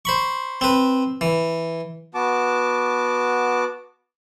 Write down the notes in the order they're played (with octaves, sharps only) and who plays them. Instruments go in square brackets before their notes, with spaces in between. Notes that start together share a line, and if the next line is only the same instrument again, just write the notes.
[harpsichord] C5 B5 C#6
C4 B4
E3
[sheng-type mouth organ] B3 F#4 A5 D6